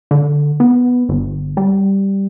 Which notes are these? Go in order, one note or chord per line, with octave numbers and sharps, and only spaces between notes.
D3
B3
G1
G3